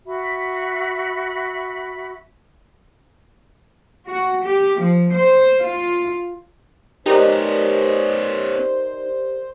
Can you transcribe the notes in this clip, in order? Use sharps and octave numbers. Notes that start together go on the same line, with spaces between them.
F#4 E5 B5
F#4
G4
F3
C5
F4
B3 C#4 D#4 G4 A#4 C5 D5